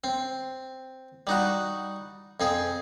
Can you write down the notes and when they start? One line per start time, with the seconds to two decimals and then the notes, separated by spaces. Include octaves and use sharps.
0.04 C4
1.27 G3 D#4 F#4
2.40 F2 C4 G#4